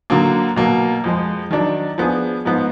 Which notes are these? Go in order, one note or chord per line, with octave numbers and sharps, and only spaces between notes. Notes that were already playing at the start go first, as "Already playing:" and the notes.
D3 F#3 A#3
B2 F#3 A#3
F2 F3 G#3
D#3 F#3 D4
F3 B3 D4 G#4
G#2 F3 B3